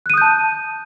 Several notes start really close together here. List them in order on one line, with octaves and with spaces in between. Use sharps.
F#6 D#7 D#6 G6 A5